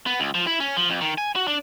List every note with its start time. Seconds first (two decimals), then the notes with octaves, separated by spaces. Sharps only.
0.06 B3
0.20 C#2
0.35 F3
0.47 E4
0.60 C#4
0.77 F3
0.90 F2
1.01 D#3
1.18 G#5
1.36 F#4
1.47 D4